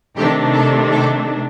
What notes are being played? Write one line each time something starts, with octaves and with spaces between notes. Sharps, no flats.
C3 D#3 A3 D4 G4
A4
A4